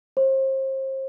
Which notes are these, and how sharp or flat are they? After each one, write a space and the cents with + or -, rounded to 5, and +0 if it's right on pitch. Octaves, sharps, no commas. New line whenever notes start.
C5 +35